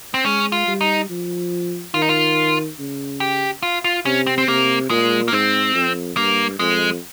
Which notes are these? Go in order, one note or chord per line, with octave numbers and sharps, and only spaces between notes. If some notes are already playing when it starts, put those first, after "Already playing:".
C4
G#3 C#4
F4
G3
D#4
F3
D#3 F4
D#4
F4
C#3
G4
F4
F4
C3 C#4
C4
C4
C3 A#3
A#2 G#3
A#3
G#2 C4
F2
G2 A#3
F2 G#3